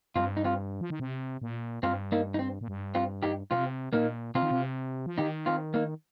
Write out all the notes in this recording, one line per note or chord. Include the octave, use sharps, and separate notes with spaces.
G2 C4 F4
D#4
C4 F4
F3
D#3
C3
A#2
G2 C4 F4
A#3 D#4
D#4
C4
A#2
G2
C4 F4
D#4 G4
C3 C4 F4
A#2 A#3 D#4
C3 C4 F4
D#3
C3
F3
D#3 D#4 G4
C4 F4
A#3 D#4